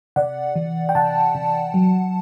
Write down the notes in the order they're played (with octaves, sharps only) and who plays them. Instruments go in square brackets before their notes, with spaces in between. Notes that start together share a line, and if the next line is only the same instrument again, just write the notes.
[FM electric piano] C3 D5 F#5
E3
G5
C3 F#5 A5
C3
F#3